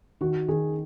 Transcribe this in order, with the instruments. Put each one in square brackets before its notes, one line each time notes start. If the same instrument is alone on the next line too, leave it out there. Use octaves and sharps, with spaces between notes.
[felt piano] D#3 [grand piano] F#4
[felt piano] D#3 [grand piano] G#4